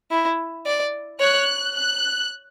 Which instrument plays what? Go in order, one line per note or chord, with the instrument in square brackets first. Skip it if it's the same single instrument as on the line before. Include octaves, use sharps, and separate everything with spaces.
[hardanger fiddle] E4
D5
[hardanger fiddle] C#5 [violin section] F#6
[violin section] F#6